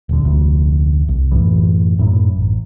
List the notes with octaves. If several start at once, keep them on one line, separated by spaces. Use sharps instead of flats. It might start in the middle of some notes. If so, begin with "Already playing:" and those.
D#1 D3
F1 D2
C2
F#2 A2 E3
F#2 A2 F#3
A1